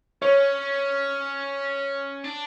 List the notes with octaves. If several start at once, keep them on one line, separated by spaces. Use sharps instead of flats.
C#4 C#5
D4